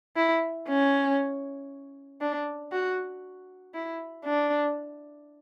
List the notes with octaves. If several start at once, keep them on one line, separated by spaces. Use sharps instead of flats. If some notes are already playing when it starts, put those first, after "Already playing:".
E4
C#4
D4
F#4
E4
D4